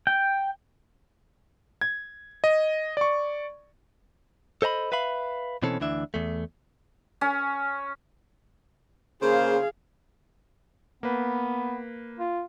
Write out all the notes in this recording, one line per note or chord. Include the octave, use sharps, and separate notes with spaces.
G5
G#6
D#5
D5 C#6
A4 C5 D#5 A#5 B5
B4 E5 F5 B5
B2 E3 C4 C#4 A4
D2 E3 D4 E5
E2 A3
C#4
C#3 A#3 G#4 C5 F5
A#3 B3 B4
F4